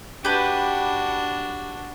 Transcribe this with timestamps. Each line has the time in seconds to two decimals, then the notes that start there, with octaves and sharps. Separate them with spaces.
0.25 D4 F#4 G4 B4